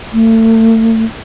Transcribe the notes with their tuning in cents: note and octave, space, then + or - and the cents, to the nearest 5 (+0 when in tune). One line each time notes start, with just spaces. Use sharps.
A3 +35